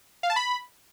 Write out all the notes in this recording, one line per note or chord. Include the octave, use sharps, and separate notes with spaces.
F5
A5
B5